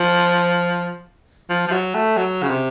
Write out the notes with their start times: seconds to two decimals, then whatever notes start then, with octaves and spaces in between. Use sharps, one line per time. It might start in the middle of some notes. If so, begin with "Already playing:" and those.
Already playing: F3
1.50 F3
1.67 F3
1.72 F#3
1.95 A3
2.17 F#3
2.42 C#3
2.50 C3